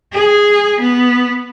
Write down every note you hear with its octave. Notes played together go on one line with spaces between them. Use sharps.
G#4
B3